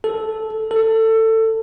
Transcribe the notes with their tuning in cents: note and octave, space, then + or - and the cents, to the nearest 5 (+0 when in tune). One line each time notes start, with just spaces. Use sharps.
A4 -10
A4 +20